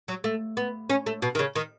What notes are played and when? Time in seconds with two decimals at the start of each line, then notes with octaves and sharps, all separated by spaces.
0.08 F#3
0.24 A3
0.57 B3
0.90 C#4
1.06 A3
1.22 B2
1.35 D#3
1.39 C#3
1.56 D#3